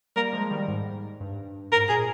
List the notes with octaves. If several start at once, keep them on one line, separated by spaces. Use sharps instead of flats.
G3 A#3 A#4
F3 G#3
D#3 G3
G#2
G2
G#2 A#4
A#2 G#4